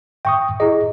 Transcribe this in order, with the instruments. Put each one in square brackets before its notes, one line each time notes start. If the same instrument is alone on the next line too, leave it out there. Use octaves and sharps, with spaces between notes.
[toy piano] E5 [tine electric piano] G5 C#6 D#6
[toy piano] E4 G4 G#4 [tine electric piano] D#5